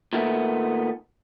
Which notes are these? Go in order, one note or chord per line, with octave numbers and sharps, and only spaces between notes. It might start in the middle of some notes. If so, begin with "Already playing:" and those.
A#2 D#3 A3 B3